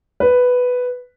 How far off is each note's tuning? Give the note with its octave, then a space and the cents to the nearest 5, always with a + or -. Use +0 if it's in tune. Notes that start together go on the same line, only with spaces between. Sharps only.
B4 +5